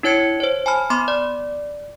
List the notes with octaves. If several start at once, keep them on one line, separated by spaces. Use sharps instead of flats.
D4 E4 C#5 G#6 C#7
C5 C#5
G#5 A5 B5 F6
B3 B5 C6 D6
D5